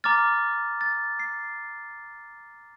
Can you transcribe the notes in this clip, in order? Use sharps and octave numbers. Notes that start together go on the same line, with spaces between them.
A#5 D6 F6 A6
A6
C7